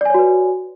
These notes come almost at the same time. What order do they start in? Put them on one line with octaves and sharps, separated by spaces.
D5 G#5 C#5 F#4 B4